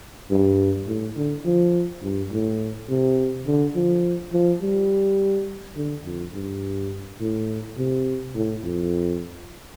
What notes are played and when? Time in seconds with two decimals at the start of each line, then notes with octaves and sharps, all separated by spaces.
0.31 G2
0.87 A2
1.16 D3
1.45 F3
2.02 G2
2.32 A2
2.89 C3
3.47 D3
3.75 F3
4.33 F3
4.62 G3
5.76 D3
6.05 F2
6.34 G2
7.20 A2
7.78 C3
8.35 A2
8.63 F2